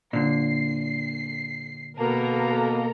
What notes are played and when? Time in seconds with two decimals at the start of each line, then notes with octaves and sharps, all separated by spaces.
0.13 A#2 D3 C7
1.99 B2 A#3 A4 A#4 A#5